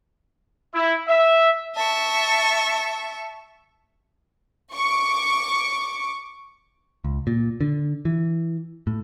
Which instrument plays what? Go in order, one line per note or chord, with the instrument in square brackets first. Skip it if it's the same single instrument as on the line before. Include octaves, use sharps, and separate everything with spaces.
[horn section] E4
E5
[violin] E5 C#6 [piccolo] A5
[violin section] C#6 D6
[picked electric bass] C#2
A#2
D3
E3
A2